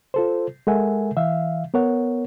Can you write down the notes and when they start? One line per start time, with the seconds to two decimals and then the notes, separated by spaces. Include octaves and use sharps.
0.14 F4 A4 C5
0.67 G#3 A4 A#4 E5 F#5 G#5
1.17 E3 E5 F5
1.74 B3 A#4 C#5 F#5